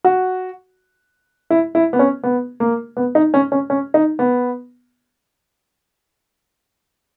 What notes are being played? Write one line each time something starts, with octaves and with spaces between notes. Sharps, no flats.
F#4
E4
E4
B3
C#4
B3
A#3
B3
D#4
C#4
C#4
C#4
D#4
B3